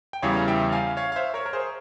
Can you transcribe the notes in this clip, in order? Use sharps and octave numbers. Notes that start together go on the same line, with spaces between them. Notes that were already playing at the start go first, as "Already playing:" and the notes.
G5
E2 C#3 E3 G3 C#5 F5
E5 G5
F5 G#5
C#5 F5
F5
C5 E5
A#4 C#5
A#4
G#4 C5